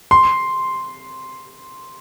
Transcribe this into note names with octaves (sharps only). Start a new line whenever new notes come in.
C6